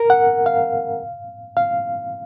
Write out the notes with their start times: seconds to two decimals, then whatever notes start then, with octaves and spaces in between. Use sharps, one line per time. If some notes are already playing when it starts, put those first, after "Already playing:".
Already playing: A#4
0.10 F#5
0.46 F5
1.57 F5